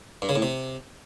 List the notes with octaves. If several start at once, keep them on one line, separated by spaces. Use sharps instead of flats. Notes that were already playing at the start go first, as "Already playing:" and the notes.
G2
C#3
A2
C3